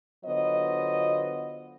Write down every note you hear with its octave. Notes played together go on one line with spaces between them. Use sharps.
D3 F#3 B3 F4 C5 D#5